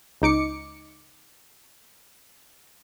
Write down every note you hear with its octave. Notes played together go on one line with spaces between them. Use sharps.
C#2 D#4 D6 C#7